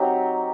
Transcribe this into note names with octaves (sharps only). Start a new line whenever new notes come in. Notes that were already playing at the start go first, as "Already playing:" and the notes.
Already playing: F#3 C4 D#4 G4